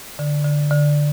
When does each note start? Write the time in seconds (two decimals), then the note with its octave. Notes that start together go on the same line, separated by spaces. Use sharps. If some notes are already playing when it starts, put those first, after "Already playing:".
0.19 D3
0.45 D3
0.71 D3